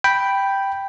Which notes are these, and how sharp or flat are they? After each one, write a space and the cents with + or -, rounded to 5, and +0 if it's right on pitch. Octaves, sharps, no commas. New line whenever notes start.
G5 +0 B5 +0